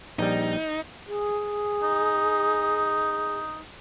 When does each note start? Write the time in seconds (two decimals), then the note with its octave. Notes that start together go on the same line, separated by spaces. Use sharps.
0.19 A#1 G3 D#4
1.07 G#4
1.83 D#4